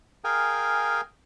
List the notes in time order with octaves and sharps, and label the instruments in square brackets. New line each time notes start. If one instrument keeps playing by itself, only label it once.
[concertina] G#4 A#4 F5 G5 G#5